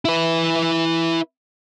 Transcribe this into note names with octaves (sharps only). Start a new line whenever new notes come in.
E4 B4